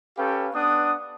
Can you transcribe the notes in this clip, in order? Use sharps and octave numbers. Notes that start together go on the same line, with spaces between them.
C#4 G4 A4 B4 F5 G5
B3 D4 F#5 D#6